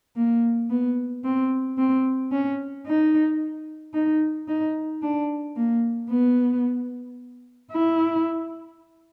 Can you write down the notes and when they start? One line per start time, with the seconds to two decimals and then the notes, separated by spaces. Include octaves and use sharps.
0.16 A#3
0.70 B3
1.24 C4
1.78 C4
2.32 C#4
2.87 D#4
3.94 D#4
4.48 D#4
5.02 D4
5.56 A#3
6.10 B3
7.72 E4